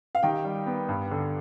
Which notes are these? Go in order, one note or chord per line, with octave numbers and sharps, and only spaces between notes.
F5
D#3 G4 G5
G3
B3
G2
D3